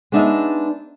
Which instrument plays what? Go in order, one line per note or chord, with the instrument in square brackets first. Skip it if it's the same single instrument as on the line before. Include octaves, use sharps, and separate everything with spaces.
[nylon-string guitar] G#3 B3 D4 D#4 E5